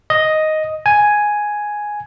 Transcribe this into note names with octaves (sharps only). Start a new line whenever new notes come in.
D#5
G#5